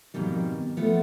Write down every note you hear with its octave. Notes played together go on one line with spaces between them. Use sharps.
F2 G#2 B2 D#3 G3
F3 A3 B3